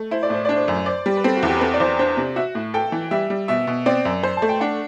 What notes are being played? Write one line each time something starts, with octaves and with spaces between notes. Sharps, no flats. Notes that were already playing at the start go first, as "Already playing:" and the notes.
Already playing: A3
E4 C5
D5
A2 C5
D4 D5
C5
F#2
C5 D5
G3
B4
C4 A4
F#4
E2
G4
B4
C4 A4
D5
E2 C5
D4 C5
C3
F#4 E5
A2
A4 G5
E3
G3 E5
G3
B2 E5
B2
C4 D5
F#2
C5
A5
A3
G5
D4 F#5